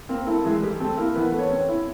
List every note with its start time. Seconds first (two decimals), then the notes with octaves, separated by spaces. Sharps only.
0.09 A#3 C4 A#4
0.26 A3 E4 A4
0.45 E3 G#3 G#4
0.62 G3 A3 G4
0.80 A3 C4 A4
0.98 A#3 E4 A#4
1.15 E3 B3 B4
1.32 A3
1.39 C#4 C#5
1.51 C4
1.68 E4